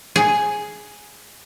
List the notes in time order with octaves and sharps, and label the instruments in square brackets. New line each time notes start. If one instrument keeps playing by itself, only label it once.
[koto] G#4